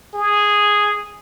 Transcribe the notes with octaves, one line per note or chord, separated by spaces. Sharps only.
G#4